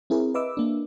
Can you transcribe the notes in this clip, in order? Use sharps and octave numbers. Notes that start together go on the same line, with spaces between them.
C4 E4 G#4 A#4
B4 D#5 E5 D6 E6
A#3 D4